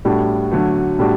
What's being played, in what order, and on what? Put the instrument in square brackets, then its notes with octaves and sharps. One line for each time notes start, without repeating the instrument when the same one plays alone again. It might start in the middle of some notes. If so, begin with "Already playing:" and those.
[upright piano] A2 G3 D4 F#4
D3 F#3 A3
A2 G3 D4 F#4